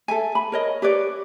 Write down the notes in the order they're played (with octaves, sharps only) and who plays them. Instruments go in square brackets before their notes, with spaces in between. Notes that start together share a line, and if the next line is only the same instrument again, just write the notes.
[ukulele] A4 E5 G#5
B5
A#4 C#5 D#5
G4 B4 C#5 D5